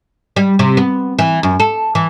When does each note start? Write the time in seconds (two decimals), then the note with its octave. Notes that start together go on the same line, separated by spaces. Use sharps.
0.36 G3
0.59 C3
0.77 B3
1.19 E3
1.43 F#2
1.60 A4
1.95 E3